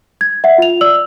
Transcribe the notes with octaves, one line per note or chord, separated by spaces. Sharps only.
G#6
E5 F#5
F4 F7
D5 E6 F#7